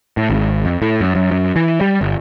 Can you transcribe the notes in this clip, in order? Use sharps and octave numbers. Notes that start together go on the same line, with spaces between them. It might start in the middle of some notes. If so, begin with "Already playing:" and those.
A2
G#1
F2
A2
F#2
F#2
F#2
E3
G3
G1